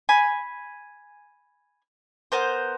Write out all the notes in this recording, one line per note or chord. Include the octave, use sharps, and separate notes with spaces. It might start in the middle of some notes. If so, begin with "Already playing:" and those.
G#5 B5
B3 A#4 C5